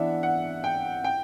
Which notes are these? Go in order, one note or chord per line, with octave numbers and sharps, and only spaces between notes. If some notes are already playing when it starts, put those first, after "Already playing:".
Already playing: E3 B3 D4 E5 F#5
F#5
G5
G5